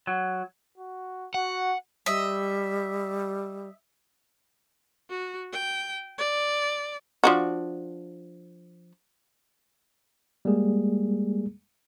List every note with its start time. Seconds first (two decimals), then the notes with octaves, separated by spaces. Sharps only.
0.07 F#3
0.78 F#4
1.34 F#4 F#5
2.06 G3 D#5 E5
5.10 F#4
5.53 G5
6.19 D5
7.24 F3 D4 F#4
10.45 G3 G#3 A#3 G#4